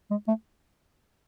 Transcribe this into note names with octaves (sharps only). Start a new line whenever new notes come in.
G#3
A3